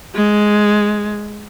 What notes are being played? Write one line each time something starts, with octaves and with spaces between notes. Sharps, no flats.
G#3